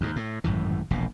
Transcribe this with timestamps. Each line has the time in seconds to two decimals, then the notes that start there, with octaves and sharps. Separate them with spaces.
0.01 D#2 G#2
0.16 A2
0.44 G#1 F#2 A2 E3
0.91 E1 A#1 B2